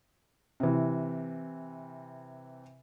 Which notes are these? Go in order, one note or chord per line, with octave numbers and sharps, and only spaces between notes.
C3 E3